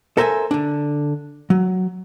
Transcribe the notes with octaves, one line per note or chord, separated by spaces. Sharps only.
A4 A#4 C5 E5 G#5
D3 D4
F#3